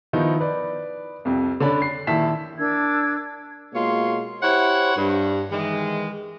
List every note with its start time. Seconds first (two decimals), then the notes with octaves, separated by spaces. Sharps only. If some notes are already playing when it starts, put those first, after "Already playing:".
0.13 D#3 F3 B3 D#4 E4
0.40 B4 D5
1.25 C2 F2
1.60 D3 C#4 D4 D5 B5
1.82 C7
2.07 A#1 D#3 E4 A5 B6 E7
2.58 D4 A#4 E6 G#6
3.74 B2 G#3 A#3 F4 C#5 C6
4.43 E4 G4 C5 C#5 F#5
4.96 G2
5.51 D#3 E3 G#3